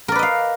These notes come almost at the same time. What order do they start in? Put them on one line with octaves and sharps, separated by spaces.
A#4 D5 B4 D#5 F5